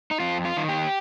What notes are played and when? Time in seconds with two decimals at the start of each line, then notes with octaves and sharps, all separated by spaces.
0.11 D#4
0.20 F2 F4
0.45 F4
0.57 D#3
0.69 G4